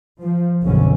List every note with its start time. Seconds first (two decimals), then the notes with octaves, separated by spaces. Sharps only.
0.19 F3
0.62 F#1 B1 B2 D3 C#4